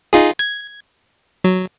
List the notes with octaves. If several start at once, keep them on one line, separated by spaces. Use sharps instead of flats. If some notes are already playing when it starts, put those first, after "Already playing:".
D#4 F4 G#4
G#6
F#3